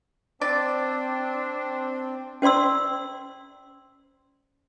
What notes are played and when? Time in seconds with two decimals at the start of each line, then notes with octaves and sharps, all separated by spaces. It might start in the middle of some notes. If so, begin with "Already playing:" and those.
0.41 C4 D4 C5 D5
2.42 C#4 C5 D5 C6 E6